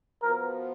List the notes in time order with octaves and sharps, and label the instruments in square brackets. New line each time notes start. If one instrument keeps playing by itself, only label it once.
[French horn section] F3 B3 F#4 B4 [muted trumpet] A#4